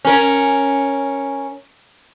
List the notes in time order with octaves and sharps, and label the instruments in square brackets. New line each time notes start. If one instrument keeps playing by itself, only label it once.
[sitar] C#4 A#4